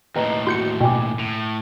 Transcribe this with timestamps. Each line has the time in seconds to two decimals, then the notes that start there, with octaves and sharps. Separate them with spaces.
0.16 D#2 A2 B4 D#5 A#5
0.47 F#4 C6 G6 C#7
0.81 B2 G5 G#5 D6
1.19 A2 F7